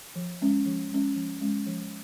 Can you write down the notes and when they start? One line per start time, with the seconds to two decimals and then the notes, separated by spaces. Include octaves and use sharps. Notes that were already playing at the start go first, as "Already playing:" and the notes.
0.16 F3
0.41 G#3 C#4
0.66 F3
0.92 G#3 C#4
1.16 F3
1.41 G#3 C#4
1.67 F3